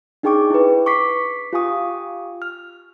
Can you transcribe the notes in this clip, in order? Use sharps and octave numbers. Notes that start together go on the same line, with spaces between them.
D4 D#4 G#4 G5 C#6 D6
E4 B4
C#6 D6 B6 C7
F4 G4 F5 G#5 C#6 D#6
F6